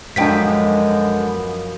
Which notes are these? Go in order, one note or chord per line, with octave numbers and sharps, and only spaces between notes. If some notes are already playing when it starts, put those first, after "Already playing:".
F#2 D3 F3 G#3 B3 D4 G5 B6